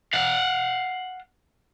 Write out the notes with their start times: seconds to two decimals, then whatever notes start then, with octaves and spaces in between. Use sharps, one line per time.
0.13 F5 F#5